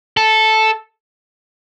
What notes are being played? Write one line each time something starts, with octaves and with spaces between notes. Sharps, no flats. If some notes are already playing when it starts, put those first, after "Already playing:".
A4